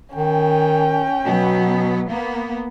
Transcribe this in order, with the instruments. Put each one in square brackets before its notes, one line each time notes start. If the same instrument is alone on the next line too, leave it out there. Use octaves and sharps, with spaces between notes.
[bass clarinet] D#3 [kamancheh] C#4 G5
[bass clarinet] B2 [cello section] F#3 B3
[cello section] A#3 B3